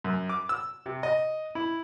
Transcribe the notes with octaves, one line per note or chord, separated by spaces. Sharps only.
F#2
D6
E6
C3
D#5
E4